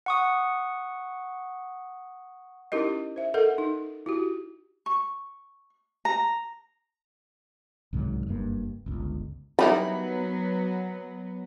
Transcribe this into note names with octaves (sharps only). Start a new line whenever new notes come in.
F#5 C#6 D#6
C#4 D#4 E4 G4 A#4 D#5
C5 E5
A4 A#4 D#5 F#5
D#4
E4 F#4 G4
C#6
A#5
C2 G#2 D#3 F#3
F#1 G2 C#3 A#3
G1 C#2
F#3 G3 B3 D#4 E4 B5